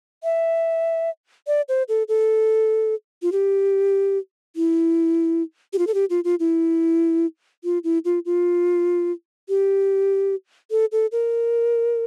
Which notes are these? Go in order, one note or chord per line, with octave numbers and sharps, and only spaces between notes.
E5
D5
C5
A4
A4
F4
G4
E4
G4
F4
A4
G4
F4
F4
E4
F4
E4
F4
F4
G4
A4
A4
A#4